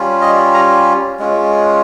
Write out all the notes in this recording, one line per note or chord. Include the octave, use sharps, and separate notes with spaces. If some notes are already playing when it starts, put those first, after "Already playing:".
Already playing: G3 C#4 F4
D#5
A#5
G#3 C#4 F4